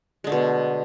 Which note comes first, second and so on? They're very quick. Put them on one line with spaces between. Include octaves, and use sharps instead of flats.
G#3 D3 A3 B2